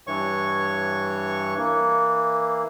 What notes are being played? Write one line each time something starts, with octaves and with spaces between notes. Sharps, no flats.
G2 E3 C#5 C#6
E3 A#3